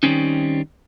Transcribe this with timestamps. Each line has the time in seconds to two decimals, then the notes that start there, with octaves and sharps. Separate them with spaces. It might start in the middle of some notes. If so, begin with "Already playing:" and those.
0.03 D#3 G3 A#3 C4 C#4 D#4